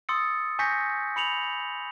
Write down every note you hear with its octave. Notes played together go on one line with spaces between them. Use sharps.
C6 D#6 E6 A6 C#7
G#5 C#6 G6 A#6 B6 C#7
B5 C#7 F7 F#7